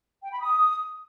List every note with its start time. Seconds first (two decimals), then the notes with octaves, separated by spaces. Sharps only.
0.23 G5
0.31 B5
0.40 D#6